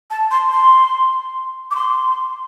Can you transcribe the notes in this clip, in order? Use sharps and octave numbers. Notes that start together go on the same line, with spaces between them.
A5
C6
C6
D6
C6